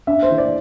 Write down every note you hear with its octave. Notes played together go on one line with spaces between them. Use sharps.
D4 E5
C5
E3
D5